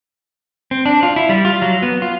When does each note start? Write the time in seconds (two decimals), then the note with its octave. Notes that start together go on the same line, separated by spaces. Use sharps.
0.71 C4
0.86 D4
1.03 F4
1.16 E4
1.29 G3
1.45 F4
1.62 F#3
1.82 B3
2.02 F4